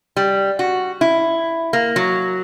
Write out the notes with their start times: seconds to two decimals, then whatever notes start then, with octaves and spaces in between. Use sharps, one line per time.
0.17 G3
0.59 F#4
1.01 E4
1.73 A#3
1.96 F#3